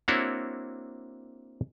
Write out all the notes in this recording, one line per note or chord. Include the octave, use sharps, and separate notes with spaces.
A#3 C4 D4 E4 F#4 C#5